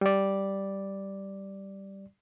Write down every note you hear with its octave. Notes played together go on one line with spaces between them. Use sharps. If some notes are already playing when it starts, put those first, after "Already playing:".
G3 D5